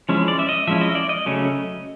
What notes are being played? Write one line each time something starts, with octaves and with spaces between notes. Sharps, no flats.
F3 G#3 C#4 E4
D5
E5
D#5
F3 G#3 C#4 E4 E5
D#5
D5
D#5
C#3 F#3 A3 C#4